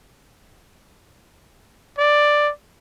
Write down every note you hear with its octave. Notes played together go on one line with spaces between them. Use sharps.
D5